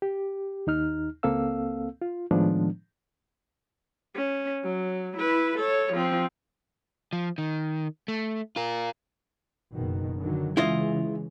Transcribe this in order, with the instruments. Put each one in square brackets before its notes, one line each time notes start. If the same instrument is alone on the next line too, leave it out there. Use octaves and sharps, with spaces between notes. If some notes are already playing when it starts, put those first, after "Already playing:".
[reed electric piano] G4
D#2 D#4 F6
C#2 A#3 C4 A4 F5 E6
F4
A2 D#3 F3 G#3 B3 D4
[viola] C#4
F#3
E4 B4
A4 C#5
F3 C4
[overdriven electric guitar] F3
D#3
A3
F4 A#4
[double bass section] F#1 B2 D#3
D3 D#3 F#3
[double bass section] C#3 E3 G#3 [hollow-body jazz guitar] E4 F4 D#5